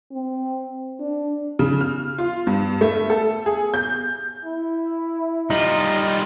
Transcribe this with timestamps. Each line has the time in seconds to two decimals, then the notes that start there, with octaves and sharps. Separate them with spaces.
0.12 C4
1.00 D4
1.59 C#3
1.81 F6
2.18 F4
2.47 G2
2.81 A3
3.10 A4
3.46 G#4
3.74 G6
4.44 E4
5.50 G3 D#4 F4